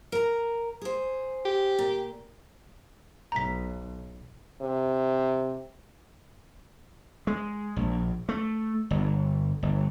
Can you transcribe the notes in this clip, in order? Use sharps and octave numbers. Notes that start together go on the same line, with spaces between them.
A#4 A#5
G#4 C5
G4
A#2
B1 A#5 B6
C3
G#3
A#1
A3
G1
G1